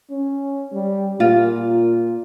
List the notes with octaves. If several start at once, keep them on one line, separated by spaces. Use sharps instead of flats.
C#4
G3
A#2 F4